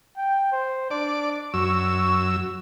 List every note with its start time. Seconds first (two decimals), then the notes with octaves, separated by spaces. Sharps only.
0.17 G5
0.52 C5
0.91 D4 D5
1.54 F#2 C#6 E6